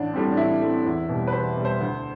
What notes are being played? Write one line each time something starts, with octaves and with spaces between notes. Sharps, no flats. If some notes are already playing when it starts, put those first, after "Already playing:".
Already playing: A1 D4
A2 G3 C4
D4
A1 E4
A2 G3 C4
E2
B2 G3
B4
E2 C5
B2 G3
C5
D2